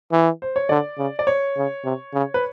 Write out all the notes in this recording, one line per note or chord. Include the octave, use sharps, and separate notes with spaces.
E3
C5
C#5
D3 D5
C#3
D5
C#5
C#3
C3
C#3
B4